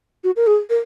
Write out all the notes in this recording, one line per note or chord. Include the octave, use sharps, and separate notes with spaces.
F#4
A#4
G#4
A#4